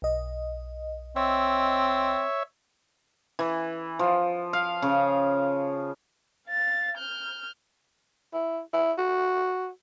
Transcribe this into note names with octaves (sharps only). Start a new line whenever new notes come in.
B1 D#5
C4 C#5 E5
E3
F3
F5
C#3
F5 A6
F6 G6
E4
E4
F#4